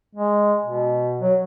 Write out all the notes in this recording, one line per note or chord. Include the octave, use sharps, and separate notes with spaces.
G#3
B2
F#3